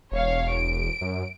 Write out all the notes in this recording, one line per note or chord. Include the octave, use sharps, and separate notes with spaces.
E1 C#5 F5
D7
F#2